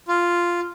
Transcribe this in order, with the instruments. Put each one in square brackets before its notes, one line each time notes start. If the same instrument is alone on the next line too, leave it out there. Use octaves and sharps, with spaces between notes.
[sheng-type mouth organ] F4